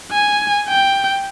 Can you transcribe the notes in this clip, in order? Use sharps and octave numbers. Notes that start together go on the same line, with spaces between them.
G#5
G5